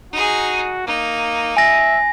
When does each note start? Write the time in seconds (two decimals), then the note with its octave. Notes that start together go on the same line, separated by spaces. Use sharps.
0.13 D#4 F#4 G#4
0.87 A#3 D#4
1.57 E5 G#5 A#6